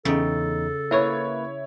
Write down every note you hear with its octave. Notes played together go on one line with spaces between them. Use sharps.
E2 C#3 D#4 A4 G5
A#3 E4 B4 C#5